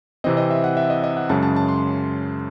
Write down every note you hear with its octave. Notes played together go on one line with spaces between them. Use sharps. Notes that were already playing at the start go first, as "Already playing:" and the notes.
C3 E3 C4 D#5
D#5
E5
F#5
E5
D#5
D#5
F#5
F#2 C#3 G#3 A5
A5
A5
C6